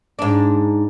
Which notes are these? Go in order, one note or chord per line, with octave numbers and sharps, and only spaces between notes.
G#2 D4